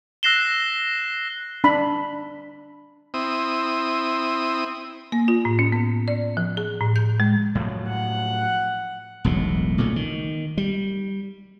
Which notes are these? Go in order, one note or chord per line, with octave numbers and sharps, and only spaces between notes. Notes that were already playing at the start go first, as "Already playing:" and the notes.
E6 F#6 A#6 C7 E7 G7
D4 B5
C4 E4 D#6
A#3
F4
A2
C#4
B3
D5
F3
G#4
A2
G6
G#3
A2 F3 F#3
F#5
E1 B1 A2
B1 A#2 C#3 A3
D#3
G3